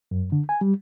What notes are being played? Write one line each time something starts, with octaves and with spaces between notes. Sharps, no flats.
F#2
D3
G#5
G3